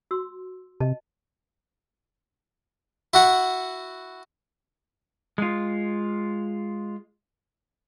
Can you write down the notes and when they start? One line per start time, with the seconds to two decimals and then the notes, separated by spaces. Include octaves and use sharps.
0.11 F#4 C6 E6
0.81 C3 D#5 A5
3.13 E4 F#4 F#5
5.38 G#3 F4